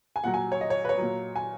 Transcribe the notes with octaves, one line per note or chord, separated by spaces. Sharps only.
G#5
A#2 F#3 F#5
G#5
C#5
D#5
C#5
B4
C#5
A#2 F#3
G#5